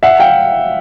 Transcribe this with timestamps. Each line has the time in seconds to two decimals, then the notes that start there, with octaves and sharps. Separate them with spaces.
0.03 E5 F#5
0.19 F5 G5